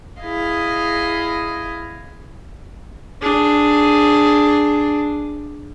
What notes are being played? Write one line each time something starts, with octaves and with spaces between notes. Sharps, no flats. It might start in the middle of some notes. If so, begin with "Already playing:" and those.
E4 G#4 D#5 F5
D4 G#4